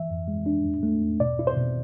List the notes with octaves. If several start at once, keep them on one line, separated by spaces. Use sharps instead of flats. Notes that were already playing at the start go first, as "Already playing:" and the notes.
Already playing: E3 E5
F2
G#3
D4
E2
A3
E2
B2 D5
E4
C5
B2